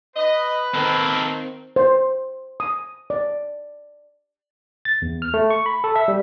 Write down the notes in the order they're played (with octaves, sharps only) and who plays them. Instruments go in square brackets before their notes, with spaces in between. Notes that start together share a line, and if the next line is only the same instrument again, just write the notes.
[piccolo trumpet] B4 [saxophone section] D#5
[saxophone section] D#3 C4 [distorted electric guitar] A#3 A4
[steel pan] C5
D#6
D5
[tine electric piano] A6
E2
F6
A3
C#6
B5
A4
E5
G3